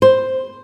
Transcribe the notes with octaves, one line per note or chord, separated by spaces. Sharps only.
C5